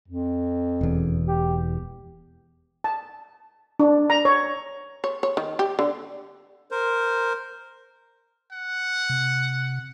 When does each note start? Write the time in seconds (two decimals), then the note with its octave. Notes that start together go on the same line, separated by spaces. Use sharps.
0.08 F2
0.81 E1 E2
1.28 G4
2.84 A5
3.79 D4
4.10 A#5
4.25 C#5
5.04 C#5
5.23 C#5
5.37 D#3
5.59 G4
5.79 D3
6.71 A#4 C5
8.53 F#5
9.09 C3